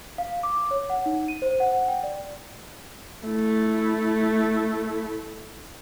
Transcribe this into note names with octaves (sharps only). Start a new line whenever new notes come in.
F5
D6
C#5
F#5
D#4
D#7
C5
F#5
G5
D5
A3 E4